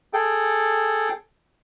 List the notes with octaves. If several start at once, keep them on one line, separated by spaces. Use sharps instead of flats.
G#4 A4 G5